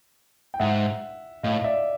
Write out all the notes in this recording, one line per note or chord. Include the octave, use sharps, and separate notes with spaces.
G5
G#2 E5 F#5
A2 D#5 F5
D5 E5